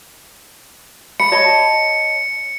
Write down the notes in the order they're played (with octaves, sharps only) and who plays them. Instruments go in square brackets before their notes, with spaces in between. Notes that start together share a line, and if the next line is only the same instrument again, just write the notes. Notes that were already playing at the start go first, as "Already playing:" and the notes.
[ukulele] B5 [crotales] C#7
[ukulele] C#5 D#5 A5